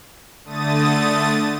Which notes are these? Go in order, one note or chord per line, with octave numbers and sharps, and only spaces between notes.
D3 A3 D#6 A6 D#7